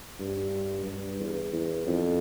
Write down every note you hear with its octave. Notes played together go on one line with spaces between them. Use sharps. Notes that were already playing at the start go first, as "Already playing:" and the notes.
G2
G2
E2
E2
F2